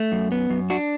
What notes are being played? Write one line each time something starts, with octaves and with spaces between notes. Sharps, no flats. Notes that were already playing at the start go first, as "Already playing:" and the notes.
Already playing: A3
F#2
B3
F#2
D4 F#4